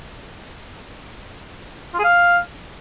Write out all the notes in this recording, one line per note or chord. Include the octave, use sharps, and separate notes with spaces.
F4
G#4
F5